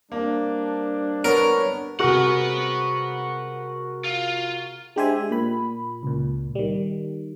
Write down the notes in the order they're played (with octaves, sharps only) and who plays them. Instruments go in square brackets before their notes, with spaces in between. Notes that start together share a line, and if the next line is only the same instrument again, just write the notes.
[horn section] G3 C4 D4 [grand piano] A#3
[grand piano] B3 [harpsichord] A#4 [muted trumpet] C#5
[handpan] C3 G#4 [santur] F#4 A#4 C#6 [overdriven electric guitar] B4 F#5
[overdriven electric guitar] F4
[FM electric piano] G#3 D4 G4 C5 E5 G#5
A#2 B5
C#2 A#2
D#3 G3